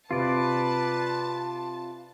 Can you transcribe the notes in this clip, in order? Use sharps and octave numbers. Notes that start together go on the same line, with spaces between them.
C3 F4 B4 D5 A5